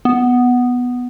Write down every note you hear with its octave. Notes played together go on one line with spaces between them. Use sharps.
B3